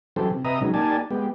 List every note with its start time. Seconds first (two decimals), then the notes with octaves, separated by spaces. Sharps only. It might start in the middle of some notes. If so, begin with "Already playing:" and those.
0.16 E3 F#3 C#4 G4 A4 C5
0.30 C3
0.45 C3 B4 D#5 E5 A#5 D#6
0.61 C#3 F#3 G#3 C#4 D#4
0.74 A#3 D#4 G4 D5 G#5 A5
1.11 G#3 B3 G4